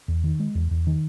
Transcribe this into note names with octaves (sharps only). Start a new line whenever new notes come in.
E2
D#3
G#3
E2
E2
D#3